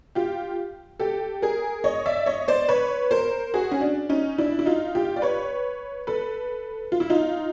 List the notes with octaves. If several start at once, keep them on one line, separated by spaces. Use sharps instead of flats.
F4 G4
G4 A4
G#4 A#4
C#5 D#5
D5 E5
C#5 D#5
C5 D5
B4 C#5
A#4 C5
F#4 G#4
C#4
D4
C#4 D#4
D4 E4
E4
D#4 F4
F4 G4
D5
B4 C#5
A4 B4
F4
E4
D#4 F4